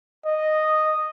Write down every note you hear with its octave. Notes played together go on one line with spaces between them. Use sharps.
D#5